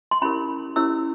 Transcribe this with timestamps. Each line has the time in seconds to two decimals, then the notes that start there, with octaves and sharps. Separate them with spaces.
0.11 C6
0.22 C#4 E4 G4 A#4 C#5 B5
0.76 C#4 E4 G4 A#4 C#5 E6